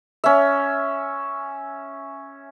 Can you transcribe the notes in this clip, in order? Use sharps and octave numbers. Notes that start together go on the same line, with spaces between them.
C#4 E5